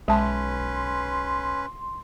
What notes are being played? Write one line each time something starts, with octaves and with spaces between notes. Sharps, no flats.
B1 G#3 C#4 B4 A5 C6